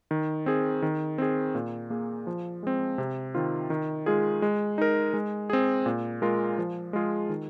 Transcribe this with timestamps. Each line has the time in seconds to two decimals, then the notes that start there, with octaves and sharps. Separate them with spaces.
0.11 D#3
0.46 C4 G#4
0.82 D#3
1.18 C4 G#4
1.55 A#2
1.90 A#3 G#4
2.27 F3
2.63 G#3 C4
2.98 C3
3.35 D#3 C4 F4
3.70 D#3
4.06 G#3 F4 G#4
4.42 G#3
4.78 D#4 A#4
5.14 G#3
5.50 C4 G#4
5.86 A#2
6.22 G#3 F4 A#4
6.58 F3
6.93 G#3 F4 G#4
7.29 D#3